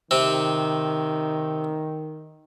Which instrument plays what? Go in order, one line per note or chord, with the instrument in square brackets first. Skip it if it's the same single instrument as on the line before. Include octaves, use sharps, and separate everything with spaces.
[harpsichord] C3 C4 [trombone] D#3